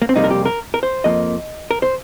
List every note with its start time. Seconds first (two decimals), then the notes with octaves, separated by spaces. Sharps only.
0.02 A#3
0.09 C4
0.16 F2 C3 G3 A#3 D#4
0.24 A#4
0.31 G4
0.45 A#4
0.74 A#4
0.83 C5
1.04 F2 F3 A#3 D#5
1.71 A#4
1.82 C5